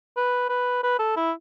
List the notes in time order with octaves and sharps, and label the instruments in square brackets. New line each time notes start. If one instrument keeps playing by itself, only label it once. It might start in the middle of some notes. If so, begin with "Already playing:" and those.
[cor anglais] B4
B4
B4
A4
E4